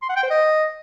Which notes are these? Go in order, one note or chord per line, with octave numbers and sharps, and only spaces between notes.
C6
F#5
G5
C5
D#5